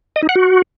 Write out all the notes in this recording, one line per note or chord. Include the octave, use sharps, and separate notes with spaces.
D#5
D#4
F#5
F#4